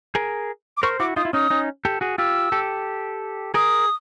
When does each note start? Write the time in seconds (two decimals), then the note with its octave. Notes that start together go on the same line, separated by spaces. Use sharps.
0.15 G#4 A#4
0.77 D6
0.83 A#4 C5 C#6
1.00 E4 F#4 D6
1.16 D#4 F4 D#6
1.25 E4
1.33 C#4 D#4 D#6
1.50 C#4 D#4
1.85 G4 A4
2.01 F#4 G#4
2.18 F4 G4 E6
2.52 G4 A4
3.54 G#4 A#4 D#6